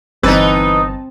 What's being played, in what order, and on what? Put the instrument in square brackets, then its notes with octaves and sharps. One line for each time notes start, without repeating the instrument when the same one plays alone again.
[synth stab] G1 A5 [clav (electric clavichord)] E3 [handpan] C4 [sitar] D#4 B4